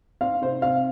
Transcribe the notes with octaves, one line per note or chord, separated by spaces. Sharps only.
C4 F5
C3 C5
C3 F5